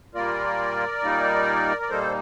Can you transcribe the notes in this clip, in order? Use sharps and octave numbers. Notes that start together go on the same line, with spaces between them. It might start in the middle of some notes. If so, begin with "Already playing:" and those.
A#2 G3 A#3 F4 A#4 D5
A#2 G3 A#3 D#4
D5
A#2 G3 A#3 D#4 A4 C5